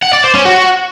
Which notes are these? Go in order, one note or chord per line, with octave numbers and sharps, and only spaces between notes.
F#5
D5
C5
C#4
F#4